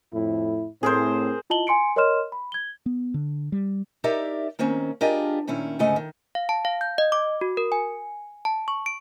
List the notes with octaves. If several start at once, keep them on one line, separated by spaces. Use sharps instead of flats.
F2 A2 E4
A2 C4 G#4 A#4 C5
E4 F4 D#5 A5 F#7 G7
G#5 C6 C#7 D7
A#4 C#5 D#5 C6 F6 E7
B5
G#6 G7
B3
D3
G3
D#4 G4 A#4 D5 E5
D#3 A#3 C4 C#4
D4 F4 G4 G#4 A#4 D#5
A#2 D#3 C#4 E4
D2 G#2 C#3 A3 D#5
D#3
F5
A5
F5
G6
D#5
D6
F#4
A#4
G#5
A5
C#6
D7